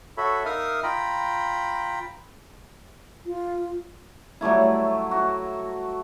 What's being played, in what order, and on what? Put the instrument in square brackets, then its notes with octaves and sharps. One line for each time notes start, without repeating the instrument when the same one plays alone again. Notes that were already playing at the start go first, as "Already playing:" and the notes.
[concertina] F#4 A4 C#5 E5 B5
D#4 A#4 E5 F5 D#6 F6
F4 G5 A#5 B5
[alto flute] F4
[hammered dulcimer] F#3 G3 A3 E4
F#4